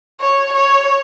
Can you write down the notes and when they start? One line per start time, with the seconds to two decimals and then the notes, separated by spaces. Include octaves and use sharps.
0.21 C#5
0.54 C#5